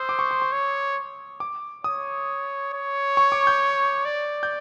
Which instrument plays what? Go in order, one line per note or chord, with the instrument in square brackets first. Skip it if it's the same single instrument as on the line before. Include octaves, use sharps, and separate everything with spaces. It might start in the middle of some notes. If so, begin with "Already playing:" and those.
Already playing: [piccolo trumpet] C5 [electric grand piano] D#6 E6
[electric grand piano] D6
C#6
C6
C#6
[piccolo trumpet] C#5
[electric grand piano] D6
[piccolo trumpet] C#5 [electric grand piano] D#6
[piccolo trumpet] C#5
[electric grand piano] C#6
D6
G6
[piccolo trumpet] D5
[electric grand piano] G6